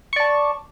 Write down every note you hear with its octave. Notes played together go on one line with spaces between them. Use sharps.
D5 A5 C#6